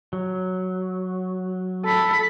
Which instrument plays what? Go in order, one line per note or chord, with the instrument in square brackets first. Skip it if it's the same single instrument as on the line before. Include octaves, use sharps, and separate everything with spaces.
[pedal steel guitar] F#3
[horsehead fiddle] A4 B5